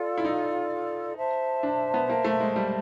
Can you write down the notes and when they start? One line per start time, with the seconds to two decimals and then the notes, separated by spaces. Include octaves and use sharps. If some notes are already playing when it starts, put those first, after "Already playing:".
Already playing: F4 A4 D5
0.18 E4
0.25 D#4
1.17 C5 E5 A5
1.63 D4
1.94 B3
2.09 A#3
2.25 A3
2.40 G#3
2.56 G3